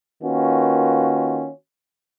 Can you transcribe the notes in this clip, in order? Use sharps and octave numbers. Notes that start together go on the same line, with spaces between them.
D#3 A#3 C#4 F4 F#4 B4